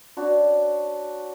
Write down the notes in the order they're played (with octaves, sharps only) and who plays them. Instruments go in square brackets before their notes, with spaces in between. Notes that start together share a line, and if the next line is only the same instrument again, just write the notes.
[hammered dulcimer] D4 F#4 C#5